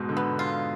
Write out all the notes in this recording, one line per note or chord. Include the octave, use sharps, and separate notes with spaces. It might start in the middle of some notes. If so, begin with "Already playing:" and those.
Already playing: G#2 B2
D3
B3
F4